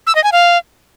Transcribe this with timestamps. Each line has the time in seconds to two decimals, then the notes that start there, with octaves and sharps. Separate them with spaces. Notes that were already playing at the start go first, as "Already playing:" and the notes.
0.07 E6
0.15 D#5
0.24 G#5
0.32 F5